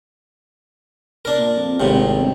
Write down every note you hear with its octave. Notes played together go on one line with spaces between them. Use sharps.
D4 A#4
A#2
F2
G#1 A2 C3
G1